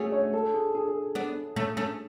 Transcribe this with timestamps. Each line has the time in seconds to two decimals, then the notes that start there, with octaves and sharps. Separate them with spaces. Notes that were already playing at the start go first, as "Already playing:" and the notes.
Already playing: A3 C#4 F#4 G#4
0.12 C#5
0.33 A4
0.54 G#4
0.75 G#4
0.88 A4
1.15 B3 D4
1.56 A3 C#4
1.77 A3 C#4